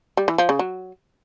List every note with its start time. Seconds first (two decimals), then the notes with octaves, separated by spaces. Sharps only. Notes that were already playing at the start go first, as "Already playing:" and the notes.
0.17 G3
0.28 E3
0.38 F3
0.49 C#3
0.59 F#3